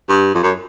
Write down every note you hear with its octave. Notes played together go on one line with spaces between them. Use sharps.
G2
F2
F#2